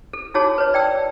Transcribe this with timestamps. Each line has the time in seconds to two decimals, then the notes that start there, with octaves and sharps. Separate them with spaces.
0.13 A4
0.34 D#4 F#4 G#4 A4 C#5 A5
0.58 B4 C#5
0.74 D5 G5 A5 E6